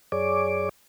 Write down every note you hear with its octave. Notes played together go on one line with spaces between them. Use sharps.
F#2 G#4 C#5 D5 D6